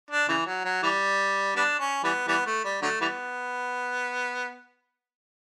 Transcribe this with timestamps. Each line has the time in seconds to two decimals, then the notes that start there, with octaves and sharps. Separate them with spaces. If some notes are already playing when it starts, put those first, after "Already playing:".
0.10 D4
0.28 C#3 E3
0.46 F#3
0.65 F#3
0.83 E3 G3
1.56 G3 B3 D4
1.79 C#4
2.04 E3 G3 B3
2.28 E3 G3 B3
2.46 A3
2.64 G3
2.82 D3 F#3 A3
3.01 E3 G3 B3